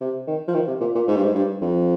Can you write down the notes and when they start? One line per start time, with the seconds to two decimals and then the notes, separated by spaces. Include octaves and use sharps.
0.01 C3
0.27 D#3
0.48 F3
0.54 D#3
0.68 C3
0.81 A#2
0.95 A#2
1.08 G#2
1.16 G2
1.25 G#2
1.35 G2
1.61 F2